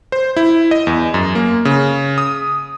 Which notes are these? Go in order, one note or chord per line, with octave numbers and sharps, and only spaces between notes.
C5
E4
D#5
E2
F#2
A#3
C#3
D#6